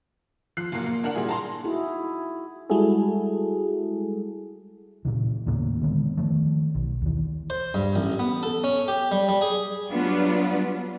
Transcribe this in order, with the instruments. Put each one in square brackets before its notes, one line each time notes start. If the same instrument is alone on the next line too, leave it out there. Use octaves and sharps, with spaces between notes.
[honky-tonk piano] F3 F#6 C7
F#1 A#2 A#3
A#3
A#3 D4 A#4 F#5 F#7
A#2 G3 E4 G#4
A5 A#5 C6
[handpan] D#4 E4 F#4 G#4
[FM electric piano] G3 G#3 E4 F#4 G#4 A4
[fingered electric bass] A#2 C#3 E3
D#2 A2 C#3 A#3
D3 D#3 G#3 B3
D#3 F3 A3
B1
D#2 E3
[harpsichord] C5
G2
A1
B3
A4
C#4
G4
G3
G3
G#4
[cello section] F#3 G3 B3 D4 F4